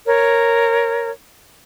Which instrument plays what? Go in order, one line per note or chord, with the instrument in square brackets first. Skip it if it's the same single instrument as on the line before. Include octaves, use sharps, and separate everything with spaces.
[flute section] A#4 C#5